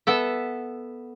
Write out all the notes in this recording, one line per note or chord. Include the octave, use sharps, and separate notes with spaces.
B3 A4 E5